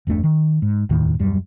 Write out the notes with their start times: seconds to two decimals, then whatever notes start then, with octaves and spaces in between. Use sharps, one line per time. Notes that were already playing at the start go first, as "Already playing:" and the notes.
0.07 G1 E2 A3 D4
0.24 D#3
0.62 G#2
0.89 F1 D#2 A2 D#3
1.19 D#1 F#2 G3